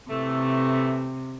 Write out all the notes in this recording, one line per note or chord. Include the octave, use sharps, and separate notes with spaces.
C3 E3 A3